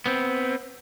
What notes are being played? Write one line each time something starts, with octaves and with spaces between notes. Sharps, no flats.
B3 C4